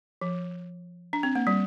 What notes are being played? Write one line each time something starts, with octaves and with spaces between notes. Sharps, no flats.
F3
D4
C4
A#3
G3